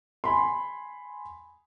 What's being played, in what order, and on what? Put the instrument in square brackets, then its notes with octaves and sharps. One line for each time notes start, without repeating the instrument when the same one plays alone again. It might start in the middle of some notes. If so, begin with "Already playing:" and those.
[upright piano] G#5 B5 C6